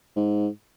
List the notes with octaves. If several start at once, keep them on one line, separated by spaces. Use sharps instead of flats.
G#2